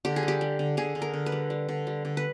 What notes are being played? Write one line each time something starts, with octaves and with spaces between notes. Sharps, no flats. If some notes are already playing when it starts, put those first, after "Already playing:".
D3 G4
G#4
G3
G4
G3
D3
D3 G#4
D3
A#4
D3
B4
G3
G3
D3
G3
D3
B4